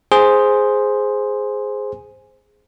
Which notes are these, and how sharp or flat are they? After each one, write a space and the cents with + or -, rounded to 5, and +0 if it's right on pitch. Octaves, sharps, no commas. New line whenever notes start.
G#4 +0 C5 +0